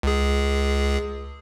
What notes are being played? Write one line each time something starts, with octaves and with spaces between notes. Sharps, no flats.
C#2 G#4